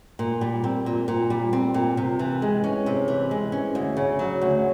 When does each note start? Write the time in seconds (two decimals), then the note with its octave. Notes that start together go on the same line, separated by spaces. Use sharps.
0.19 A#2
0.41 G3
0.64 C4
0.86 A#2
1.08 A#2
1.30 G3
1.53 C4
1.74 A#2
1.97 C3
2.19 E3
2.42 G#3
2.64 C#4
2.86 C3
3.08 E3
3.31 G#3
3.52 C#4
3.75 D2
3.97 C#3
4.19 F#3
4.41 D2